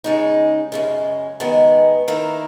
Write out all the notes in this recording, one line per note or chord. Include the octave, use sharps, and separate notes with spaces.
C#3 G#3 D#4
F#2 C#3 G#3
G#2 D#3 G#3 B3
D#3 A#3 E4